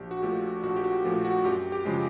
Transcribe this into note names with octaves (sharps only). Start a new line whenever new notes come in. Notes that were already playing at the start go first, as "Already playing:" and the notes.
Already playing: A#1 G4
F#4
A#2 F3 A3 G4
A#1 F#4
G4
F#4
A#2 F3 A3
F#4
F#2 G4
G4
C#3 F3 G#3